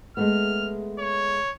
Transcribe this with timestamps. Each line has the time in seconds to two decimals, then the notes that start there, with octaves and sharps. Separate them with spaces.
0.17 G#3 A3 B3 F6
0.99 C#5